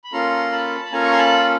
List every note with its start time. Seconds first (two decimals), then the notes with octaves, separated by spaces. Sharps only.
0.04 B5
0.13 A#3 C#4 F4 A4 A#5 C6
0.52 A5 B5
0.85 B5
0.92 A#3 C#4 F4 A4 G#5 A#5
1.04 C#6
1.12 C6
1.18 A5 B5